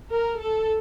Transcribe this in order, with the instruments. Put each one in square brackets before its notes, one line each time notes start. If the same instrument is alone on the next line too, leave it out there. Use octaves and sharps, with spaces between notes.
[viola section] A#4
A4